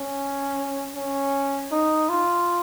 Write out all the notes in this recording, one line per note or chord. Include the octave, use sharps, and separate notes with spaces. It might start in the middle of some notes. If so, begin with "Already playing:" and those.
Already playing: C#4
C#4
D#4
F4